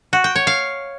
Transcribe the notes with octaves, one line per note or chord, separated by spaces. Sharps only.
F#4
G5
C#5
F5